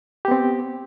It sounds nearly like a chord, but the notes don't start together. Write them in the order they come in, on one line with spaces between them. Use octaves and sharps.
G4 B3 C4